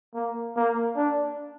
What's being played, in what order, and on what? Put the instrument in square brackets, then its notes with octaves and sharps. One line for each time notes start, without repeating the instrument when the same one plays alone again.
[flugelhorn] A#3
A#3
D4